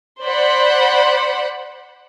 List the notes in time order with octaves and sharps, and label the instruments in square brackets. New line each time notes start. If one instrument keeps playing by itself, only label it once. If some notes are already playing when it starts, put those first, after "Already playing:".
[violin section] C5 D5 F#5 B5